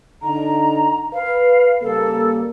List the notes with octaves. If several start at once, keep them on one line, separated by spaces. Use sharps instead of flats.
D3 D#4 A#5
B4 F5
C#3 G3 A#3 A4